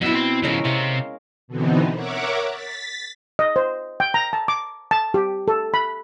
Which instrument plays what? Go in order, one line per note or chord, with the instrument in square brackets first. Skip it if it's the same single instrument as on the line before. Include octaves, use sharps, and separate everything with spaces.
[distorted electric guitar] F#2 E5 [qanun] B2 E4
[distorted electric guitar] C4 C6
[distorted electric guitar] C#3 F3 [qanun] G#3 C#4 A#4
[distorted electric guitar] C3 C4 [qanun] F5
[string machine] B2 D3 E3 B3 C4 D#4
A#4 C#5 E5 F#5 D6
A6 B6
[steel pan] D#5
C5
G5
A#5
A5
D6
A5
G4
A4
B5